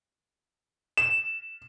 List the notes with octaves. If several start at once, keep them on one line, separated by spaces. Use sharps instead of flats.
E7